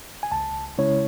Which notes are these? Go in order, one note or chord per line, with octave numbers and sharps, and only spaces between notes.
G#5
C#2 A5
C#3 G#3 C#4 E4 C#5